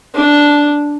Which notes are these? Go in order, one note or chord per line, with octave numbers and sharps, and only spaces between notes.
D4